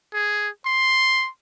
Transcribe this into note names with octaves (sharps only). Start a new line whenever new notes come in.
G#4
C6